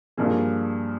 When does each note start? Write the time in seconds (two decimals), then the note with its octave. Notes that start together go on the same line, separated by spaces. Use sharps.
0.17 G2 F3 A#3 G#4